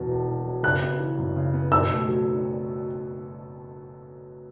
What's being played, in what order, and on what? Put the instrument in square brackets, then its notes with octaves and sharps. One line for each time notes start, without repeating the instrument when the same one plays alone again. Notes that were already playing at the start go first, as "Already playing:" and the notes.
Already playing: [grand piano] E2 B2 F#3
E1
E2
F#3
[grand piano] C#3 [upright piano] F#6
[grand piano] B3
E3
F#2
C#3
B3
[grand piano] B2 [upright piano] E6
[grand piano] A3
F#3